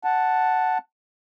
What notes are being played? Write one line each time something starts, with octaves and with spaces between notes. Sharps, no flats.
F#5 A5